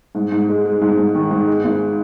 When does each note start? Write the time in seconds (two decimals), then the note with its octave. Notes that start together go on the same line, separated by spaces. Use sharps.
0.15 G#2
0.32 G#2
0.49 G#3
0.66 G#3
0.81 G#2
0.98 G#2
1.15 D#3
1.31 G#2
1.47 G#3
1.64 G#1